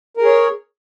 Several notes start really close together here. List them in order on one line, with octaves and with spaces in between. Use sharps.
A#4 G#4 C#5